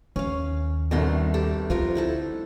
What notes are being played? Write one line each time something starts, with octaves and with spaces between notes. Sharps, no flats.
D#2 C#4 F5
G1 C2 B2 D#3 A3 C6
G4 A4
D2 F3 F4 A#4
D#4 E4 A4